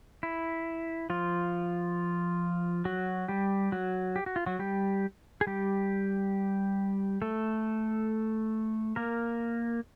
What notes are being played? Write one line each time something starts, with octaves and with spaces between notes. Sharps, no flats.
E4
F3 F4
F#3 F#4
G3 G4
F#3 F#4
G4
F#4
F4
F#3 F#4
G3 G4
G#4
G3 G4
A3 A4
A#3 A#4